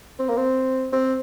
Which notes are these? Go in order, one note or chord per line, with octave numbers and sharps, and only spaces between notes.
C4
A#3
C4
C4